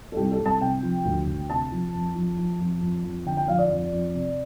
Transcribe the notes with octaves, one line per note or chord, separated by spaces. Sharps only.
A4
C2 G4
A4
C2
A5
C3 G5
F3
D2
D2
C3 A5
F3
F2
F3
F3
F2
F2
F2
D3 G5
G5
F3 F5
D5
F2
F2
C3